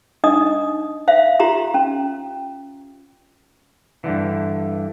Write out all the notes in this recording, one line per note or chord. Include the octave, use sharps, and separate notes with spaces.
D4 D#4 D#5 D#6
C5 E5 F5
F4 G4 A#5 C6
C#4
G2 A#2 D3 E3